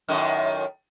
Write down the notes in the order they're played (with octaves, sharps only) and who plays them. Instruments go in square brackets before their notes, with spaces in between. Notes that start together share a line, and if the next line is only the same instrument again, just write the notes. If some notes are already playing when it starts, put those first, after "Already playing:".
[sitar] F#2 A2 D#3